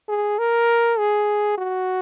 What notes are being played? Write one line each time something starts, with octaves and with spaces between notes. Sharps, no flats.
G#4
A#4
G#4
F#4